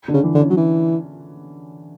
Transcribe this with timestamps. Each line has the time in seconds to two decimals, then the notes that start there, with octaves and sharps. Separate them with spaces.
0.08 D3
0.14 C#3
0.24 E3
0.35 D3
0.41 C#4
0.50 F#3
0.57 E3